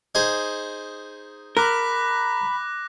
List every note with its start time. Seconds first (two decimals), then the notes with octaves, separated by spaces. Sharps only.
0.15 D#4 G#4 C5
1.57 A#4 B5 D6 F#6 A#6